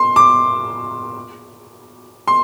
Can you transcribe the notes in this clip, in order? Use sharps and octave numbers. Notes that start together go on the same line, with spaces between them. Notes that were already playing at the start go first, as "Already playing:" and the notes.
Already playing: C6
D6
C6